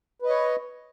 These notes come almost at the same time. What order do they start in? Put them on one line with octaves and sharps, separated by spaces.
B4 D#5 C#5